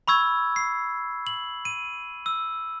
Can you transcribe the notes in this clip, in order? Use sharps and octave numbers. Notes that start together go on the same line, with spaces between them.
B5 C#6 E6 G#6
C7
F#7
D#7
E6